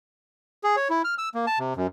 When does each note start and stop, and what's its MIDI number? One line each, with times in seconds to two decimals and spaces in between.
0.64 0.76 68
0.76 0.88 73
0.90 1.02 64
1.04 1.14 89
1.18 1.29 88
1.34 1.46 58
1.47 1.59 81
1.59 1.74 48
1.77 1.87 42